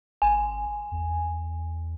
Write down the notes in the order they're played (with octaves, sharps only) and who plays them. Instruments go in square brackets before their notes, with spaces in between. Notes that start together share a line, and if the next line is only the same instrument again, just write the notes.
[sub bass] G#1 [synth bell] G#5
[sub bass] E2